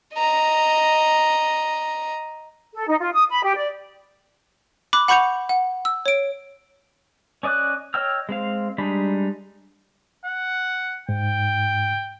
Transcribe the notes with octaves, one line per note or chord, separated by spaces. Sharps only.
D#5 A#5
A4
D#4
F4
D#6
B5
G4
D5
B5 D6 F#6
F#5 B5 C#6 G6 C#7 F7
F#5
E6
C#5 D7
C#4 D5 D#5 D6 F#6
C#5 D#5 G5 E6 F6
G#3 C4 F5
G3 G#3 D4 D#4 B5
F#5
G#2 G5